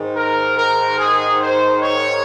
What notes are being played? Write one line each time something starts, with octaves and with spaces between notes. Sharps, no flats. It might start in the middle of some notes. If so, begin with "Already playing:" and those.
Already playing: G#2 D#3
A#4
A#4
G#4
C5
C#5